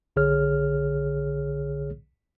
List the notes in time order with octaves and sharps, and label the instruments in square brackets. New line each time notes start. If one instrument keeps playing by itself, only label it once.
[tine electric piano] B1 D3 G#4 C#5 F6